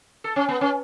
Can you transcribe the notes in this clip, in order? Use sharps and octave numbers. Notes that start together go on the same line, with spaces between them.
A4
C#4
B3
C#4